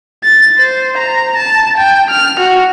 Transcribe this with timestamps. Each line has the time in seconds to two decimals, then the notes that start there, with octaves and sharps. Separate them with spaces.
0.24 A6
0.58 C5
0.98 A#5
1.37 A5
1.78 G5
2.11 F6
2.40 F#4